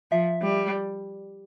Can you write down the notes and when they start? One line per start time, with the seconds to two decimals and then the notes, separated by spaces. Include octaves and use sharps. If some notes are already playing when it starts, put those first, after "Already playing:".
0.11 F3 E5
0.42 G3